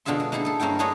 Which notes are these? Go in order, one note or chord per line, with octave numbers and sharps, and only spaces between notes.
B2 D3 F4 G#4 E5 C6
G#3
A#3 D#4 E4 G#4 A4
G#4 A4
G2 A#3 C#4 E4 G5
A3 D4 E4 G#4 C#5 D#5